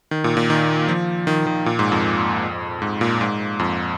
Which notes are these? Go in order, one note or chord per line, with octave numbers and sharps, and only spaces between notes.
D#3
A#2
A#2
D#3
F3
D#3
D#3
A#2
G#2
F2
G#2
A#2
G#2
F2